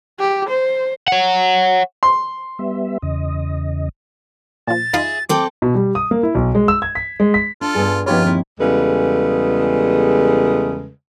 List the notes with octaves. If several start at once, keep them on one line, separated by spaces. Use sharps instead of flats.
G4
C5
C#5 F#5
C6
G3 B3 E5
E2 C#3 D#5
A#2 F3 A6
D#4 F4 G#4 E5 B5
C4 A4 G5 D6
B2
G3
D#6
A#3
E4
B1
G#3
E6
G#6
B6
G#3
B6
D4 F4 A4
G2 B3 G#4
G2 F3 B3 C#4 D#4 F4 G4 C#5
D#2 C4 E4
E2 C#3 G3 G#3 A4 B4